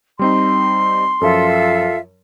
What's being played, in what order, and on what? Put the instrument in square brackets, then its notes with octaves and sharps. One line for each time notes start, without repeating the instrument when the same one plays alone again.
[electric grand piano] G3 C4 D#4 [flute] C6
[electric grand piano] F#2 F3 [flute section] F4 A4 E5